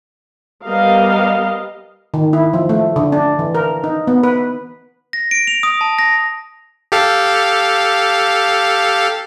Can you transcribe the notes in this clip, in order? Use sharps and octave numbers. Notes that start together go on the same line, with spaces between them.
G3 B3 A#4 D#5 F5
D#3
E4
F3
A3
D3
D4
E3
A#4
D#4
B3
B4
A#6
D7
F7
D#6
A5
A#6
G4 A4 F5